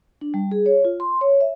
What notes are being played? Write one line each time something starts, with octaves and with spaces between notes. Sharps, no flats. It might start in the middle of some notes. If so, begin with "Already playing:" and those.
D4
G3
G#4
C#5
F4
C6
C#5
E5